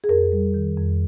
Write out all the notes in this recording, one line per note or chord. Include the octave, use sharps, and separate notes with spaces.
G#4
F2 A#4
G3
D#3
F2